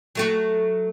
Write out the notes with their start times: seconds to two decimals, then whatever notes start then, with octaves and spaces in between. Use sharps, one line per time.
0.15 F#3 A3 F#4